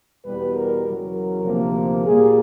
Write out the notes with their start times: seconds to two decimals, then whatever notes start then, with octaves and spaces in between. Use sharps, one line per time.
0.25 E2 B2 G3 B3 B4
0.54 A#4
0.84 E2 C#3 F#3 A#4
1.43 D2 C3 F3 A#3
2.02 A#2 G3 A#3 G#4